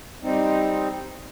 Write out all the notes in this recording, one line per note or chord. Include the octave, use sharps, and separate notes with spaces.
G3 C4 D#4